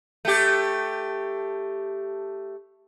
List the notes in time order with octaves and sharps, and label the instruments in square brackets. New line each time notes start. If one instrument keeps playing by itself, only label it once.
[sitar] A3 G4